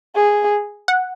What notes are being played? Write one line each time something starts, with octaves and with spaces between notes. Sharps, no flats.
G#4
F#5